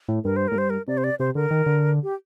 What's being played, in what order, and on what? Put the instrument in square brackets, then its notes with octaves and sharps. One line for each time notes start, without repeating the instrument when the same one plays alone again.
[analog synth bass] A2
[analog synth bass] G2 [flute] A#4
[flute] C5
[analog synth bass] A2 [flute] A#4
[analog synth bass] G2 [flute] C5
[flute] A#4
[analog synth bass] C3 [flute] D5
[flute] C5
D5
[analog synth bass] C3 [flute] C5
[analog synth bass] D3 [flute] A#4
[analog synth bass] D#3
D3
[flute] G4